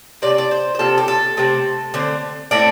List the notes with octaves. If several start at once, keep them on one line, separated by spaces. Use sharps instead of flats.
C3 A3 C4 D5
D5
C5
C5
C3 F3 C4 A4
G4
A4
C3 A3 C4
D3 A3 C4
A2 A3 C4 D5